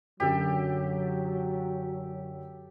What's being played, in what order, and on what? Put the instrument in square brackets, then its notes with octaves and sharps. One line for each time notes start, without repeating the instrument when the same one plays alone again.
[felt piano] F#2 D3 [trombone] F#3 [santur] G4 A4